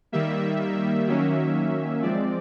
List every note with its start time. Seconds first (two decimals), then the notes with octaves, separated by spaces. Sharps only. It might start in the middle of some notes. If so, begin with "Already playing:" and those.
0.12 D#3 G3 A#3 E5
1.07 D#3 F#3 A#3 C#4
2.02 F3 G#3 C4 D5